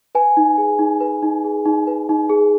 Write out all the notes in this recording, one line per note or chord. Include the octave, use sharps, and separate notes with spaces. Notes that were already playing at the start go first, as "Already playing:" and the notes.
B4 G#5
D#4
G#4
D#4
B4
D#4
G#4
D#4
B4
D#4
G#4